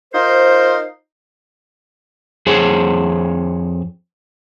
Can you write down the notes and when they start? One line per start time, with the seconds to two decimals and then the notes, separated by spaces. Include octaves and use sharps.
0.14 D#4 F4 A#4 C5
2.46 F2 G#4 C5 C#5